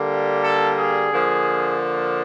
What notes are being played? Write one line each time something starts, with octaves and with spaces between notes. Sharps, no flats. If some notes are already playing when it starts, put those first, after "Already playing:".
Already playing: D3 G3 A#3
A4
G#4
D3 F3 A#3